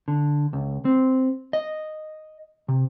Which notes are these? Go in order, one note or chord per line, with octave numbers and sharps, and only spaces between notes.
D3
C#2
C4
D#5
C3